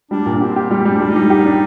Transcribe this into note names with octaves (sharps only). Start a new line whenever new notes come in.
G3 D4
A#2
D4
C4 G4
G4
G3 C4
G3
D4
G3
D#4
G3
G4
D4